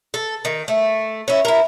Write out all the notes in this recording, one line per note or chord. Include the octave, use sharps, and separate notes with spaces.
A4
D#3
A3
C#4 E4
E4 A#4